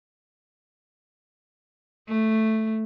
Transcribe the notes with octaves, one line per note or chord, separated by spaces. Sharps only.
A3